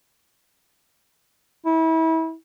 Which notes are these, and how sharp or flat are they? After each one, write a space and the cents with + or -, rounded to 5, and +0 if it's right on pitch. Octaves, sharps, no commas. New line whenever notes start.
E4 -30